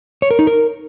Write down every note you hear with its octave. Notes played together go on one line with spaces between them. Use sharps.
C#5
A#4
D#4
A#4